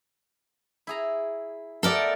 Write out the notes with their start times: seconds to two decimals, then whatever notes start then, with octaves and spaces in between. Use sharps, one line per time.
0.87 E4 G#4 A#5
1.83 A3 B3 A4 A#4 D5 G5